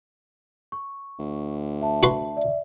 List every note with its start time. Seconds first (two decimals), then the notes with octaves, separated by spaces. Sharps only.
0.72 C#6
1.19 D2
1.82 E5 A5
2.03 F#4 B4 C6
2.37 D5 E5